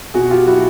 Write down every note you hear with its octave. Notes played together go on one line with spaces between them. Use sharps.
B2 F#4 G#4
F4 G4
F#3 E4 F#4